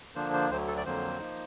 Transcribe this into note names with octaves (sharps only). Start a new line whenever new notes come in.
D3 F3 A#3 D4 C5
C5
D2 D3 F#3 C5
A4
D5
F2 D3 F#3 A#3 C5
F3 A#3 D#4